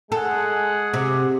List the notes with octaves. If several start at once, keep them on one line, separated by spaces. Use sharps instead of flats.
G#3 G#4 A4 F#5
C3